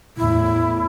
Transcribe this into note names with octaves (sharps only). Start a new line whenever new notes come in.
E2 A2 E4